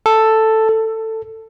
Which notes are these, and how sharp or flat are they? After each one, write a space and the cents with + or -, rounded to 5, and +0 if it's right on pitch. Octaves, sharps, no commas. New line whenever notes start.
A4 +5
A4 +15